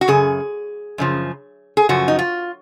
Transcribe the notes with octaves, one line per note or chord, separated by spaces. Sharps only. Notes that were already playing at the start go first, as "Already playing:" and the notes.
F#4
F#2 C#3 G#4
F#2 C#3 F3
G#4
F#2 C#3 F3 F#4
D#4
F4